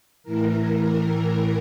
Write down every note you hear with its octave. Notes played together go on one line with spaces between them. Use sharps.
A2 E3 A#4
A#4